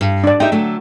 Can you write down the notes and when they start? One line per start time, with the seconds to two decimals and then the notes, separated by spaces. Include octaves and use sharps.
0.01 G2
0.24 D4 D5
0.40 D#4 G4 E5 G5
0.52 D3 F#3 A3